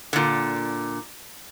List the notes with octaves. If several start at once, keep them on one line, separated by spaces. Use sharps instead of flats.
A#2 D3